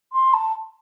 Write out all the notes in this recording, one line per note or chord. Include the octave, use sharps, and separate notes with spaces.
C6
A5